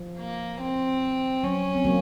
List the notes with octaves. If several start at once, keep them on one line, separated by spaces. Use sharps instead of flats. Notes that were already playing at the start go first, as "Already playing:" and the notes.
Already playing: F3
A#3
C4
F#3 C#4
C4
F#3 A#3